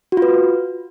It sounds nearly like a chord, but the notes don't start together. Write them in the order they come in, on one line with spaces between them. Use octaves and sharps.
F#4 F4 B4